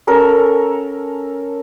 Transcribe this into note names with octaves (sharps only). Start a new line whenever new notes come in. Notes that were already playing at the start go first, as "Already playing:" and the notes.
C#4 A4 A#4